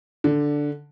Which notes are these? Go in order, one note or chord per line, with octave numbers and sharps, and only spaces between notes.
D3